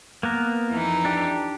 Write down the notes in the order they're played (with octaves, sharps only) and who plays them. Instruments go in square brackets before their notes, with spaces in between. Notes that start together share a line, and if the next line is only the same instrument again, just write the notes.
[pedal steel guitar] A#3 B3 A#4
[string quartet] F2 E3 D#4
[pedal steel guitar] D4 G4